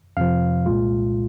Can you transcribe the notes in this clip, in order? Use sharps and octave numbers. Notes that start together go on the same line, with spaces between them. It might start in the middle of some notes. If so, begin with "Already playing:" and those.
F2 C3 F3 F5
C2 A#2 G#3 F4